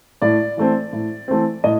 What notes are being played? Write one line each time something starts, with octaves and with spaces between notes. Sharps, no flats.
A2 D5
E3 A3 C4
A2
E3 A3 C4
A2 D#5